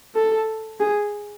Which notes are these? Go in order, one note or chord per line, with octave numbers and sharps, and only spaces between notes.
A4
G#4